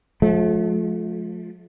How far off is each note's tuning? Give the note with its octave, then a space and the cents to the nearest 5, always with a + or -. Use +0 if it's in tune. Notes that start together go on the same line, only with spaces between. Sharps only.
F3 +25 A3 -40